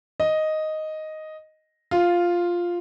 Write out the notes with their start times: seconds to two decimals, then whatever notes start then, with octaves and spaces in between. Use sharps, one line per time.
0.20 D#5
1.91 F4